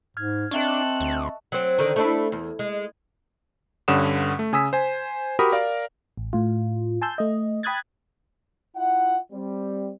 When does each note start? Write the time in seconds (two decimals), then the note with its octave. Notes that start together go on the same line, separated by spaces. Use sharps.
0.17 G#2 F6 G#6
0.51 C4 D4 A4 D#5 E5 C#6 F#6
1.00 D2
1.52 F#3 C4
1.79 D3 D#3
1.96 A3 D4 E4
2.32 E2
2.59 G#3
3.88 G2 D3 C#4 F#5 D#6 E7
4.39 A3
4.53 C#3 G#5 D#6 E6 B6
4.73 C5 G#5
5.39 F#4 G4 A#4 B5 D#6
5.52 A#4 D5 F5
6.17 A1
6.33 A2 F4
7.02 G#5 A5 C6 E6 G6
7.18 A3 D#5
7.63 G5 B5 D#6 F#6 G#6 A6
8.76 E4 F4 E5 F#5
9.32 G3 C4